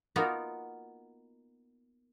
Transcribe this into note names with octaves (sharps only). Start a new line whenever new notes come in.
A#3 B3 D#4 F4 F#4 A#4